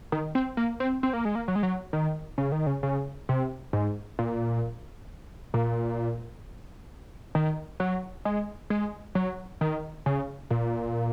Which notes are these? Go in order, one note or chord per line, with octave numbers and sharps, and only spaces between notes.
D#3
C4
A#3
C4
C4
A#3
G#3
A#3
F#3
G#3
F#3
D#3
C#3
D#3
C#3
C#3
C3
G#2
A#2
A#2
D#3
F#3
G#3
G#3
F#3
D#3
C#3
A#2